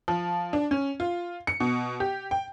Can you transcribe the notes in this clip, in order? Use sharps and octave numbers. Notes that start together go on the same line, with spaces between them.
F3
D4
C#4
F4
C#7
B2
G4
G5